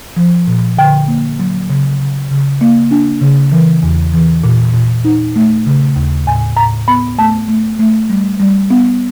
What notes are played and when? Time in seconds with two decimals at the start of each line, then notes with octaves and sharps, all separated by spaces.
0.17 F3
0.47 A#2
0.77 D3 G5
1.08 A#3
1.39 F#3
1.70 C#3
2.00 C#3
2.31 C#3
2.61 A#3
2.91 D4
3.21 C#3
3.52 E3
3.83 E2
4.14 E3
4.44 A#2
4.74 A#2
5.05 D#4
5.36 A3
5.66 C#3
5.96 D#2
6.26 A2 G#5
6.57 A2 A#5
6.88 B3 B5
7.18 A3 A5
7.48 A3
7.79 A3
8.10 G3
8.40 G3
8.70 B3